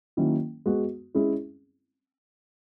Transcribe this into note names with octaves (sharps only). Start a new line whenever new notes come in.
D#3 F#3 A#3 C#4 E4
G#3 B3 F#4
G#3 C#4 E4 G#4